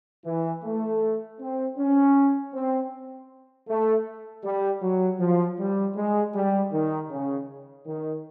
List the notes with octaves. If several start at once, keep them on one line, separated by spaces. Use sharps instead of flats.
E3
A3
C4
C#4
C4
A3
G3
F#3
F3
G3
G#3
G3
D#3
C#3
D#3